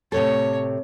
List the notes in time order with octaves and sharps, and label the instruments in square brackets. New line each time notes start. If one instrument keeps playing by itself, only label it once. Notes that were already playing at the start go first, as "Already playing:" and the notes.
[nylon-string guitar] A2 C3 A4 [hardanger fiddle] C#5